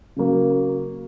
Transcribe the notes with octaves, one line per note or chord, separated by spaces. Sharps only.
C#3 F#3 A#3